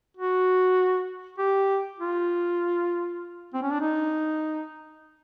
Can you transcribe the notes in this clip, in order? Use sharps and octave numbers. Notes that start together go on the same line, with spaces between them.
F#4
G4
F4
C4
C#4
D4
D#4